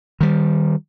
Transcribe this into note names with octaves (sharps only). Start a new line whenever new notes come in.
D#3 G3